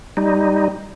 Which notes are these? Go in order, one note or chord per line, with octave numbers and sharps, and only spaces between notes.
G3 D#4